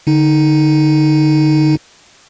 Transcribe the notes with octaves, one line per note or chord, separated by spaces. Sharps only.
D3 D#4